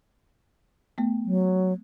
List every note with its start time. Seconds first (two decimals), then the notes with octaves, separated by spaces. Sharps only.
0.98 A3 B3
1.25 F#3